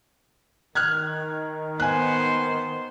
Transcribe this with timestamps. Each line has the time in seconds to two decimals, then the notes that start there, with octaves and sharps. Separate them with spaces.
0.75 D#3 F6 F#6 G#6
1.80 B3 C5 G#5 F#6